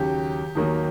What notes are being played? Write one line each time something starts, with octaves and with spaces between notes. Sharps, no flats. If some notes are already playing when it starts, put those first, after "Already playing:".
Already playing: D#2 C#3 F#3 G4
D#2 D#3 F#3 A#3